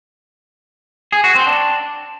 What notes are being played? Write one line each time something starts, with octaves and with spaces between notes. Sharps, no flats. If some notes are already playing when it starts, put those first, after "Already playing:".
G#4
F#4
C4
D4